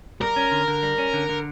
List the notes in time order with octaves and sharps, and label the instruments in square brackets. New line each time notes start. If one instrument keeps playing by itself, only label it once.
[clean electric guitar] G3 [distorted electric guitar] A#4
[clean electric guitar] C#4
D3
D3
G3
C#4
D3
D3